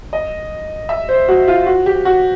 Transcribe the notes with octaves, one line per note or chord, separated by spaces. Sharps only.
D#5
E5
C5
F#4
F4
F#4
G4
F#4